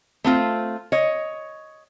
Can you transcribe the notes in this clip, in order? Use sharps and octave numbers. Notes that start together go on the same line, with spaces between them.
A3 C4 F4
C#5 D#5